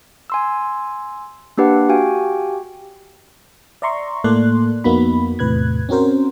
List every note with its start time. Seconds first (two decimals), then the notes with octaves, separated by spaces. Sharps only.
0.30 G#5 C6 E6
1.57 A#3 D4 G4 B4 F#5
1.89 F#4 G4 F5 G5 G#5
3.82 D5 E5 A#5 C6 C#6
4.24 A2 A#3 A4 D5 C6 F#6
4.84 F2 A#3 B3 D#4 F#4 B5
5.39 E2 A2 C3 B4 F#6 G#6
5.89 C4 C#4 F#4 A#4 C5